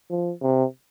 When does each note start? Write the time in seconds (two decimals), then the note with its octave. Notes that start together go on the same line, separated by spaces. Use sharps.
0.10 F3
0.42 C3